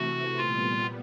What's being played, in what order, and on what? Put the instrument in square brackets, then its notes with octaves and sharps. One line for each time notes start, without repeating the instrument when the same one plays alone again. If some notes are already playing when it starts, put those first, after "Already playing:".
Already playing: [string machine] C3 E3 A3 [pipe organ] F#4
[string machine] A#2 G3 B3 [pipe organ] F4